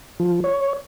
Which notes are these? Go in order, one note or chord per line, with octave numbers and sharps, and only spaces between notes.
F3
C#5